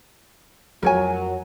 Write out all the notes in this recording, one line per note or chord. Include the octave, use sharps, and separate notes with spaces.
F2 F#3 A#4 C#5 G#5